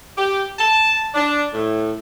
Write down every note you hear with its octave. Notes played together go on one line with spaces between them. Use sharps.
G4
A5
D4
A2